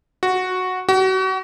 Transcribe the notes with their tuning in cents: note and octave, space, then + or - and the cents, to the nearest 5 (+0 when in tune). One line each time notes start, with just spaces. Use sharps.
F#4 -5
F#4 +35